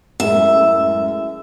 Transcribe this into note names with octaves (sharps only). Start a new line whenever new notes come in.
F#2 A2 G#3 E5